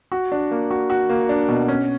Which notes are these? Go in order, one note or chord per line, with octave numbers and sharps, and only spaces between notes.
F#4
D4
A#3
F#4
F#4
A#3
D4
B2
C#4